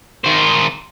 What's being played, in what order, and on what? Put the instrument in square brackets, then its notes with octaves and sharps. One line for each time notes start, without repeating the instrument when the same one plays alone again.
[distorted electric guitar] D#3 C5